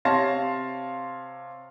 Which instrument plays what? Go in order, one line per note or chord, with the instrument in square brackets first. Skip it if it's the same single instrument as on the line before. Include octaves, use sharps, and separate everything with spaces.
[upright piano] C3 C#5 F5 A5 C6 A#6